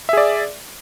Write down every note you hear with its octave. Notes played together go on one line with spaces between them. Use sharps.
G#4 D5 E5